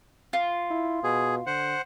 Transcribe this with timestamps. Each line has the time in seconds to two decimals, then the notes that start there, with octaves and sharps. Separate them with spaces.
0.33 F4
0.70 E4
1.03 B2 G#4
1.47 D3 C5 F#5